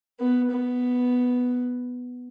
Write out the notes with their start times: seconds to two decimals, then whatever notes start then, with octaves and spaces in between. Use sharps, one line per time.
0.20 B3
0.51 B3